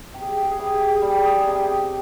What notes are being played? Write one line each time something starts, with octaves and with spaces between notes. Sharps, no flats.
C3 G4
G#4
G4
G#4
G4
G#4
E3 G4
G#4
G4
G#4
G4
G#4
G3 G4
G#4
G4
G#4
G4
G#4
C3 G4
G#4
G4